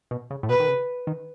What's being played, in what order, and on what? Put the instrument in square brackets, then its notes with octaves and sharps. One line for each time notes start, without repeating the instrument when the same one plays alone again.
[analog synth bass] B2
C#3
A2
[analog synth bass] B2 [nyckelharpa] B4
[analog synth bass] D#3
C#3
D#3